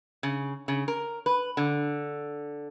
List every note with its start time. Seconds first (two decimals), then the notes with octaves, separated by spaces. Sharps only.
0.23 C#3
0.68 C#3
0.88 A#4
1.26 B4
1.57 D3